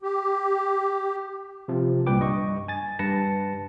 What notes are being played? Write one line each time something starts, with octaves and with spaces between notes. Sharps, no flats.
G4
C3 F3
C2 A#2 G3 B4 G5 D6
G2 D#5 C#6
G#5 A6
G2 B4 A5 A#6 C#7